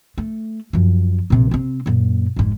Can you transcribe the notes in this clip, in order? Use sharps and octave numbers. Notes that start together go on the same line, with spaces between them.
A3
F#2 F3
A#1 C3
C3 C4
F#2 A#2
F1 G#2